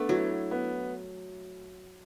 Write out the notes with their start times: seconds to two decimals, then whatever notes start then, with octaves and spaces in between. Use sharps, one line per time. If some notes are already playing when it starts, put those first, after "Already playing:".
Already playing: A3 B3 D4
0.09 F#3 E4
0.51 B3